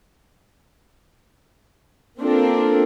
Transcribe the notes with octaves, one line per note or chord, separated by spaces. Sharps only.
A#3 C4 D4 F4 A4 A#4